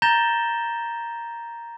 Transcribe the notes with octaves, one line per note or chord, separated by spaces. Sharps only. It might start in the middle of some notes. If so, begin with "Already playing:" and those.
A#5 G6 A6 A#6 E7 G7